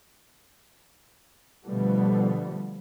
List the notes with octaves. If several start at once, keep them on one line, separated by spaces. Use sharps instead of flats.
B2 D3 F3 G3 A3 B3